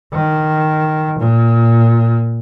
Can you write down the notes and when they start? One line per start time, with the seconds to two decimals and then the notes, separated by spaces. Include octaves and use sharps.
0.13 D#3
1.19 A#2